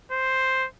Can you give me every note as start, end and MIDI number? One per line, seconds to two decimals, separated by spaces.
0.12 0.67 72